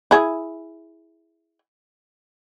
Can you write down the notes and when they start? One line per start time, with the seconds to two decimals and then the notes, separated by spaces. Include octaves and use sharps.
0.11 E4 G#4